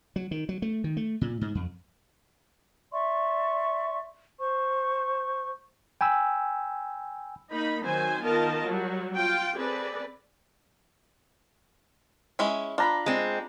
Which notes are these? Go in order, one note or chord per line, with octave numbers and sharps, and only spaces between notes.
F#3
D#3
F#3
A3
D#3
A3
A#2
G#2
F2
D5 E5 C6 C#6
C5 C#6
G5 G#5 B5 E6
A#3 D#4 B5
D#3 F#3 C4 C5 G#5
D#3 B3 F4 A#4 D#5 A5
F#3 G3
F4 G5
C4 G#4 A4 B4 D5
G#3 C#4 E4
D4 F4 A#5 B5
G#3 C4